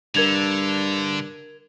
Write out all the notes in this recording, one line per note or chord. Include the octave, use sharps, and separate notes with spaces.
G2 D3 A#4 G#6 F7